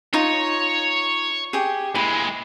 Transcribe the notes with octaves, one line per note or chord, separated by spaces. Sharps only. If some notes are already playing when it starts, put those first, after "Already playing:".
D#4 F4 C#5
G4 G#4
A#2 G#3 E4